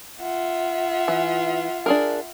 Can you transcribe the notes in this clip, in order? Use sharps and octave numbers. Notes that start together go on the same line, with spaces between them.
F4 E5 F#5
E3
D4 G#4 A#4